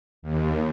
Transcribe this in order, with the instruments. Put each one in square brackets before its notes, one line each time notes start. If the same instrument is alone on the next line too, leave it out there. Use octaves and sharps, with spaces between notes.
[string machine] D#2